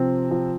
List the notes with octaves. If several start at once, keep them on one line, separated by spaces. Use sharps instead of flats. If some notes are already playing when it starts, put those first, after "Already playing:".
Already playing: C3 F3 C4
F3